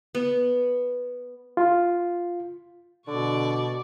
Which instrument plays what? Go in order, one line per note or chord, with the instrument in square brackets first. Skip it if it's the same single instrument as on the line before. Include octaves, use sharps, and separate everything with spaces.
[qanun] B3
[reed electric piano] F4
[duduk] B2 [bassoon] D3 [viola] D5 C#6